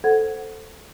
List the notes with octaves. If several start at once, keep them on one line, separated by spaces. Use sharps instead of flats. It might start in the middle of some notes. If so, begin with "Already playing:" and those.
A4 C5 F#5 G#6